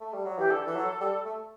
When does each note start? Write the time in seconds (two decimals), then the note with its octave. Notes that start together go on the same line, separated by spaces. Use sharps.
0.01 A3
0.13 G3
0.26 F#3
0.38 E3 G4
0.50 D3 A4
0.67 E3
0.76 F#3
1.01 G3
1.25 A3